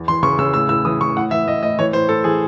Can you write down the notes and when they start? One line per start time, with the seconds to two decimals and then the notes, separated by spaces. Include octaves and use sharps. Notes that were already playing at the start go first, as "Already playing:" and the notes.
Already playing: E2
0.08 E3 C6
0.23 C#3 C#6
0.38 C#3 E6
0.54 A2 E6
0.69 A2 E6
0.85 E3 D#6
1.00 E3 C#6
1.16 A2 F#5
1.31 E3 E5
1.47 A2 D#5
1.63 A2 D#5
1.79 E3 C#5
1.93 A2 C5
2.09 A2 A4
2.24 E3 G#4